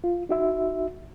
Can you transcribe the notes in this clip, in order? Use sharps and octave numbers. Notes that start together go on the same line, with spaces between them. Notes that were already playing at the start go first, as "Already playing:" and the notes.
F4
D#4 F#4 E5